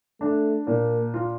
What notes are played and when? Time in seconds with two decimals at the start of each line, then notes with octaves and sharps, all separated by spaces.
0.20 A3 D4
0.67 A#2 A#3
1.14 F4